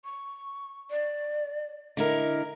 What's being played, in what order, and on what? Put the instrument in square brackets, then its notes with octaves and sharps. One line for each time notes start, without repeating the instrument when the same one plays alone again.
[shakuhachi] C#6
D5
[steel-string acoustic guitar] D3 E4 A#4 [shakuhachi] D#5